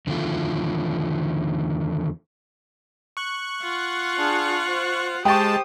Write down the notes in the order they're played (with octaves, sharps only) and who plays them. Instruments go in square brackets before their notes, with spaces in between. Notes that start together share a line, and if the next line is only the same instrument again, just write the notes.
[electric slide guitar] E2 D3 D#3 F3 A3 F4
[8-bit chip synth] C#6 F#6
[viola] F4 F#5
[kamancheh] D4 G#4
C5
[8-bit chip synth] G#3 A5 [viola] G4 C5 [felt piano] G5 C#6 [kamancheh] D#6